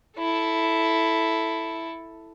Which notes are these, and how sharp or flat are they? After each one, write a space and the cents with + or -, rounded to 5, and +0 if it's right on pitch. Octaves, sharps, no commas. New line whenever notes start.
E4 +0 A4 +0